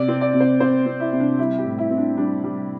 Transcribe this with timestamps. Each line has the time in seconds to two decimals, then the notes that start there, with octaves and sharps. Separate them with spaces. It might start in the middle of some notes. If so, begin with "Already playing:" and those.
Already playing: C3 D5
0.08 C4
0.21 D5
0.34 C3
0.40 C5
0.60 C4 C5
0.86 C4
1.00 E4
1.13 C3
1.20 D4
1.39 G3 E4
1.58 G4
1.65 A2
1.78 E4
1.91 C4
1.97 D4
2.17 G3 D4
2.44 G3